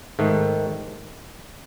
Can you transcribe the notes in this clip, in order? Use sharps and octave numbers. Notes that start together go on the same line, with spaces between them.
G#2 D#3 A3